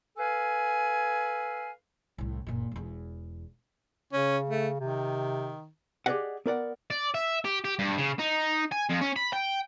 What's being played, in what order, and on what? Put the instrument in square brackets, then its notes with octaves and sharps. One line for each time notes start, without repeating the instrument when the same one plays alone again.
[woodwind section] A4 B4 F5 G#5
[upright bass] C2 A2
F#1 A#2
E1 E2
[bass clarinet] C#3 [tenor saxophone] C#4
[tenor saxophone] A3
[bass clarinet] C3 [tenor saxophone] D#3
[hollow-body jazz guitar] G4 G#4 A#4 D5 D#5 F#5
B3 A#4 D5 F#5
[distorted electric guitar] D5
E5
G4
G4
G2
C#3
D#4
G#5
F2
C#4
B5
G5